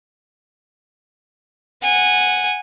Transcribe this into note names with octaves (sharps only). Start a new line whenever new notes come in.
F#5 G#5